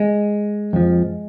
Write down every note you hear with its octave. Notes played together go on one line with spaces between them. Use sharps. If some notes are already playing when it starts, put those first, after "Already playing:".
Already playing: G#3
F2 F3